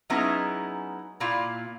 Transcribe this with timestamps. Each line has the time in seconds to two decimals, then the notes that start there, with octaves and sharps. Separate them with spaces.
0.10 F#3 G#3 B3 C#4 D#4 E4
1.20 A#2 A#3 E4 F4 F5